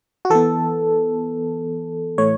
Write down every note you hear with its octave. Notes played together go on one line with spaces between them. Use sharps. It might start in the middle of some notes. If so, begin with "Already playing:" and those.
F#4
E3 B3 A4
A2 E3 A3 C#5